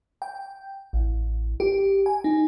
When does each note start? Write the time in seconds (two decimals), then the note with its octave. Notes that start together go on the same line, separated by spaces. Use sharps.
0.22 G5
0.93 A1
1.60 G4
2.06 G#5
2.24 D#4